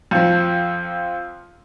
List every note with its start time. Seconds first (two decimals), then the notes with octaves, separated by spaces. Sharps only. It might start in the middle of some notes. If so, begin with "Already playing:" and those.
0.11 F2 F3